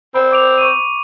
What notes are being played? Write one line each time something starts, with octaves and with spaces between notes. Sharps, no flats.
C4 B5
D6 D7 F7
C#6 D#7